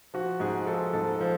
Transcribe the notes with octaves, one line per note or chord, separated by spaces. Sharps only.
F3 F#4
G#2 G#4
F3 A4
G#2 A4
F3